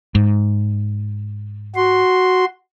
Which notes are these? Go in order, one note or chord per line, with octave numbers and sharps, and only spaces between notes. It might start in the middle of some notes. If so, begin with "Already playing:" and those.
G#2
F#4 C6